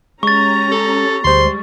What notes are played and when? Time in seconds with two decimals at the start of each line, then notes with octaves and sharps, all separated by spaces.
0.23 G#3 C#4 G4 A#5 C#6 A6
0.72 A4
1.24 D2 G3 G#3 C5 C6